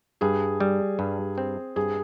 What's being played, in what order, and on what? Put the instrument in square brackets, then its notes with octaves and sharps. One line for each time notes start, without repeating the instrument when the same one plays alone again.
[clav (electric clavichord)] G2 [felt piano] G#4
[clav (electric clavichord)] G3
G2
C4
[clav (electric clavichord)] G2 [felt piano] G#4